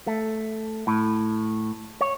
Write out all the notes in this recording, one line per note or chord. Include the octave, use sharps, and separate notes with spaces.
A3
A2
C#5